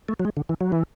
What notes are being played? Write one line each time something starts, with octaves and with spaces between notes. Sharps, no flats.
A3
F#3
G#3
D3
E3
F#3
E3